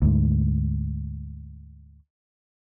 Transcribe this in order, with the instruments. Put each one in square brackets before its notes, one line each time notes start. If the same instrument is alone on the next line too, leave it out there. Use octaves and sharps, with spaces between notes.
[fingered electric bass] D2 G#2